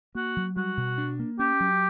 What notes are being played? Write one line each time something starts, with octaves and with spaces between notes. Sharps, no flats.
A#3 F#4
F#3
G3 F#4
B2
D4
A#3
C#4 G4
F#3